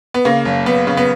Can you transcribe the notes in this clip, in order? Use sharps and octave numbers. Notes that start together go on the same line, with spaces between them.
B3
C#3 A#3
F#1
F#1 B3
C#3
B3